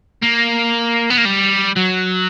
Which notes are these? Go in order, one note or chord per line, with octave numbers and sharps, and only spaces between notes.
A#3
B3
A#3
G3
F#3